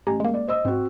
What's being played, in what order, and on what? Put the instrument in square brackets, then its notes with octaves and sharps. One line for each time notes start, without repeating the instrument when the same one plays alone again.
[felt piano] A1 [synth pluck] G4 G#5 A#5
[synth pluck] G#3 A#3
[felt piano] D5
C5 D#5 E6
[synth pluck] G#2 [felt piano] C4 F#4